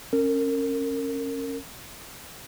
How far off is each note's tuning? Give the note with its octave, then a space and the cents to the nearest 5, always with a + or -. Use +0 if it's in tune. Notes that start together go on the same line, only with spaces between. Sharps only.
C#4 -20 A#4 -25